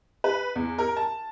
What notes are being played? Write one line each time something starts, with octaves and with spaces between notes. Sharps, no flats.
B4
E2
A#4
A5